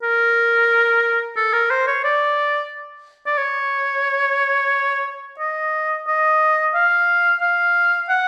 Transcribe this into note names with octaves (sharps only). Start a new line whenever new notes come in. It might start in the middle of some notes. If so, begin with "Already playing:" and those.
A#4
A4
A#4
C5
C#5
D5
D5
C#5
D#5
D#5
F5
F5
F#5